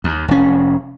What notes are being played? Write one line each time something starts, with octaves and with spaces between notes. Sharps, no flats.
D#2
F1 C#4